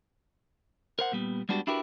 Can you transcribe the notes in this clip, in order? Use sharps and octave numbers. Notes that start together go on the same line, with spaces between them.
A#4 C5 F#5
A#2 G3 B3
G3 G#3 B3 D4 F#4 G4
D4 E4 F#4 G4 A#4 B4